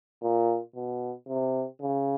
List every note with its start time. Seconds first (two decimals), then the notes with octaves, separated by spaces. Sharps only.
0.22 A#2
0.75 B2
1.28 C3
1.81 C#3